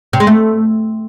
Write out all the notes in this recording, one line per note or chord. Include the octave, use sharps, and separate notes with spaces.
C3
G#3
A3